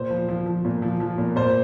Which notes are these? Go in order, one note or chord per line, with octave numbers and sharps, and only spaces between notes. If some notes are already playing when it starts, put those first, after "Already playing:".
Already playing: A#2 C5
F3
F3
F3
A#2
F3
F3
A#2
A#2 C5